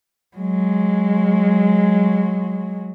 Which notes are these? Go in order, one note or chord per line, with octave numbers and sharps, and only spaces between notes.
F#3 G#3